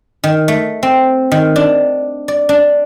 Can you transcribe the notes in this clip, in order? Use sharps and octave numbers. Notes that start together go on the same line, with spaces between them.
D#3
A3
C4
D#3
D4
D5
D4